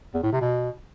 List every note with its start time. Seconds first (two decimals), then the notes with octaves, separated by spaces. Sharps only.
0.14 E2
0.23 A2
0.32 C3
0.41 B2